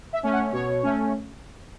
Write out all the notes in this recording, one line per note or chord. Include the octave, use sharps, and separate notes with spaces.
E5
A3 C#4
F#5
B2 C#5
A3 C#4